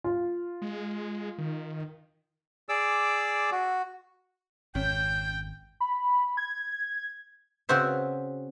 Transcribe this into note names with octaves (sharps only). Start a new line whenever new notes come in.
F4
G#3
D#3
G#4 D5 D6 E6
F#4
G#1 F2 C#4 G5 G6
B5
G#6
C#3 C4 F#4 C5 E5